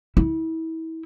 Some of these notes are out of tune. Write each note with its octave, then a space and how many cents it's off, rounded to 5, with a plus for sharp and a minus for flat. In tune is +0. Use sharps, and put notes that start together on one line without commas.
E4 -30